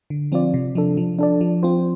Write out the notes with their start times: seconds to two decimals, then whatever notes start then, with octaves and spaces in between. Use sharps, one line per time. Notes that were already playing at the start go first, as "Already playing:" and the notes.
0.10 D3
0.32 F3 C4 F4 D5
0.54 C3
0.75 F3 D4 A4
0.97 F3
1.19 D4 A4 D5
1.41 F3
1.63 C4 F4 C5